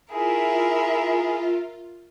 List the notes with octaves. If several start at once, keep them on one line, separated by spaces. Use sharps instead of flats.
E4 F4 G#4 A#4 E5